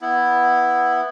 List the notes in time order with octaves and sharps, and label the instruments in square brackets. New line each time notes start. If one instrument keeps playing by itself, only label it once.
[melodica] B3 E4